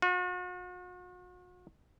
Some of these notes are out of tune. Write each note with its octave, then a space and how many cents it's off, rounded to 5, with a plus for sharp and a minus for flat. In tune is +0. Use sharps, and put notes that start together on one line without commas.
F#4 -45